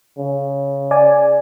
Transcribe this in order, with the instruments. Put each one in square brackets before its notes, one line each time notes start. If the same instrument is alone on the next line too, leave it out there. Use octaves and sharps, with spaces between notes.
[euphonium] C#3
[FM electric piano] D5 G#5